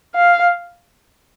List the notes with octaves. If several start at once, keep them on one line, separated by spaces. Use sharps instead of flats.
F5